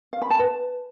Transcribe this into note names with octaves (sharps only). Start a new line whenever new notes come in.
F5
B5
A5
B4